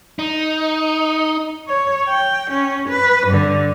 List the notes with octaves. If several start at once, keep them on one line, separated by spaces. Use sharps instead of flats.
D#4
C#5
G5
C#4
B4
G2 D3